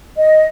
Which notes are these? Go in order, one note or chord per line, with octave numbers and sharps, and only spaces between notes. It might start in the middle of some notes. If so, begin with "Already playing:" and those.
D#5